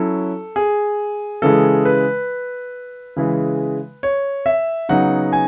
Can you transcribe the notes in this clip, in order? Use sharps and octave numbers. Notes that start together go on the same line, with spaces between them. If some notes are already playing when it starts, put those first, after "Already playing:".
Already playing: F#3 C#4 E4 A4
G#4
C#3 E3 G#3 A4
B4
C#3 E3 G#3
C#5
E5
C#3 F#3 B3 D#4 F#5
G#5